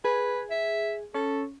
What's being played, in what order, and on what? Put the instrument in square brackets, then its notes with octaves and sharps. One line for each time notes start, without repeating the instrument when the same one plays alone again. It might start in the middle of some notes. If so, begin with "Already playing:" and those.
[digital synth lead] G#4 [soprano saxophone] B4
[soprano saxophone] E5
[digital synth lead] C#4 [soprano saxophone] A4